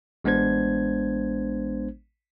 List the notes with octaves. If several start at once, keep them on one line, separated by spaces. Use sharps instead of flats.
A1 G#3 B3 D4 C5 G#6